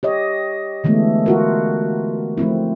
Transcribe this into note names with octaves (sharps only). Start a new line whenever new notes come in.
G4 C#5 D#5
D3 E3 G#3 A3 B3
F4 F#4 A#4
F3 A3 C4 E4